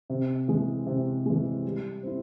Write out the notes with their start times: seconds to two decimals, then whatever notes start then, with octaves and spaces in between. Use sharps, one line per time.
0.10 C3
0.48 E3 G#3
0.86 C3
1.26 E3 G#3
1.65 G3
2.03 C4 E4